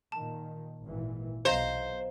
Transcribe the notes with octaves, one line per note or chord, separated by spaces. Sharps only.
A#2 D#3 A5
G#1 A#2 E3
B1 C5 D#5 F5 A#5